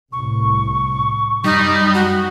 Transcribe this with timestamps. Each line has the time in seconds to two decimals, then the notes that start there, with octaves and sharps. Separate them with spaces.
0.12 C2 A2 C#6
1.44 F#2 G3 D#4
1.94 F#4